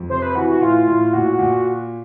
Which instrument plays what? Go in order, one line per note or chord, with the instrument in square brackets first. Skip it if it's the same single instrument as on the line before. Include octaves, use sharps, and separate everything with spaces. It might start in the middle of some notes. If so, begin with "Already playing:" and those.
Already playing: [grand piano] F2
[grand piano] C3 [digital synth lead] C5
[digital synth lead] B4
[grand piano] E3 [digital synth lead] F#4
[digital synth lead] F#4
[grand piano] A2 [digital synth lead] F4
[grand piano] A2
[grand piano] A#2 [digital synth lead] F#4
[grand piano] A#2